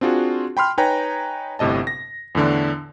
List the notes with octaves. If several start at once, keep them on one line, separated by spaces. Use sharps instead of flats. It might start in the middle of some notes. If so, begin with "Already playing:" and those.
C4 D4 F4 F#4 G#4
G5 B5 C6 F6
D#4 B4 C#5 G5 G#5 A#5
G1 A2 C3 D#5 A5
A#6
E2 A2 D3 D4